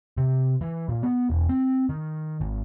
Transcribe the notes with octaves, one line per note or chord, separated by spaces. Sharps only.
C3
E3
A#2
B3
E1
C4
D#3
G#1